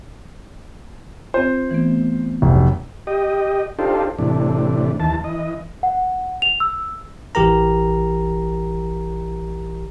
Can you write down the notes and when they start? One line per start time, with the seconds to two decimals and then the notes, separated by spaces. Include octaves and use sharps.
1.34 C4 F4 C5
1.71 E3 A3 B3
2.42 F1 B1
3.07 G4 D#5
3.79 D4 D#4 F4 G4 A4 C5
4.18 A2 C3 E3 D4
5.00 D#2 E3 A5
5.24 E3 D#5
5.83 F#5
6.42 F7
6.60 E6
7.35 A1 E3 G4 A#4 A#5